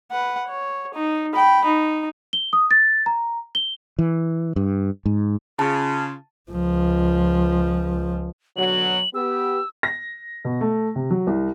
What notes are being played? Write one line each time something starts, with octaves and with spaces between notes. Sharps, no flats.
B4 F#5
C#5
D#4
G5 B5
D#4
G7
D#6
A6
A#5
G7
E3
G2
G#2
C#3 F4 A5
C#2 F3
B2 D3 F#3 F#7
B3 G4 E6
A#6
B2
A3
C3
F#3
C2